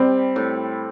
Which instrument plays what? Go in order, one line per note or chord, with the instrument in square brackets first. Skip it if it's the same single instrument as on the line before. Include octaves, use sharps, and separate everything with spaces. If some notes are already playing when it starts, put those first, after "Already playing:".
Already playing: [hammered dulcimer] G3 [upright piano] C4
[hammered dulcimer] A2